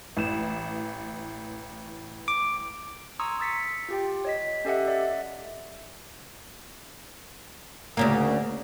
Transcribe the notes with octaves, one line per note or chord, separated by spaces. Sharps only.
A1 E3 E7
D6
A#5 C6 C#6 D#6 E6 G#6
D#6 E6 A6 B6 C#7
F4 G4 G5
C#5 D#5 B6
C#4 G4 A4 D#5 E5 F#5
D5 E5
D2 C#3 A#3